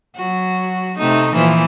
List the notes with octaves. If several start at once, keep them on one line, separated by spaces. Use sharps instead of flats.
F#3 F#4
C3 A3 D#4
A#2 E3 F3